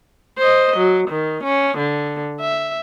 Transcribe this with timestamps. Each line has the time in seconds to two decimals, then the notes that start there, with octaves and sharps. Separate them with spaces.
0.38 C5 D#5
0.77 F#3
1.09 D#3
1.44 C#4
1.78 D3
2.40 E5